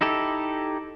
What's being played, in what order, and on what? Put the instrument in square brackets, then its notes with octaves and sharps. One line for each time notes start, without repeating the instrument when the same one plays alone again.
[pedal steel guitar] D#4 E4 G4 A4